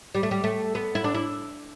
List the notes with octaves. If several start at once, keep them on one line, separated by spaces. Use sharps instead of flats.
G3
A3
G3
A3
B3
E4
D4
E4